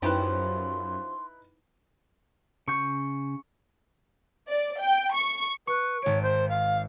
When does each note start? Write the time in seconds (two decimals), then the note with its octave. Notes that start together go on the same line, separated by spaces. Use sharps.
0.02 F#2 F3 C#4 D#4 E4 G4 B4 C6
2.68 C#3 C#6 G6
4.48 D5
4.80 G5
5.13 C#6
5.67 B4 C#6
6.02 G#1 C#5 D7
6.22 C5
6.49 F5